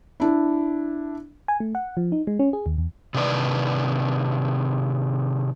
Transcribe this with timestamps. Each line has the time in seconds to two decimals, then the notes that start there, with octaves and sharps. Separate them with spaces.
0.20 D4 E4
1.48 G#5
1.60 A3
1.75 F#5
1.97 F3
2.12 D#4
2.27 G#3
2.39 C#4
2.53 G#4
2.66 D#2
2.78 E2
3.14 C3 D#3 D4 B4 D5